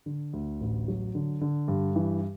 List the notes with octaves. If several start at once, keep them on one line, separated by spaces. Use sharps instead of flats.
D3
D2
A1
F#3
D3
D3
G2
E3